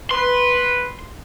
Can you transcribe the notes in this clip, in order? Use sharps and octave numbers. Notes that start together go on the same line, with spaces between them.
B4 C6